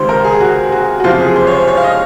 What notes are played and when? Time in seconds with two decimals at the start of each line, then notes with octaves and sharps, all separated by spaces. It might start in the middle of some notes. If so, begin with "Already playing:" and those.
Already playing: C#2 C3 D#3 C5
0.09 A#4
0.24 G#4
0.40 F#4
0.72 F#4
1.00 F#4
1.04 F#1 F2 C3 F3 F4
1.20 G#4
1.36 C5
1.47 C#5
1.51 C5
1.68 C#5
1.77 F5
1.83 D#5